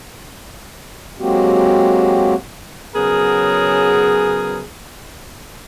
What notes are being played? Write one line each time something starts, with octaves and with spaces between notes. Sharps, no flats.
F#3 G#3 A#3 C4 F#4 G4
C#3 F#3 B3 G#4 A#4